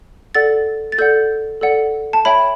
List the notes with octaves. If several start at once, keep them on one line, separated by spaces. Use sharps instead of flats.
A4 D5 F#5 A6
A6
A4 D5 F#5 G6
A4 D5 F#5
A5
C#5 E5 G5 B5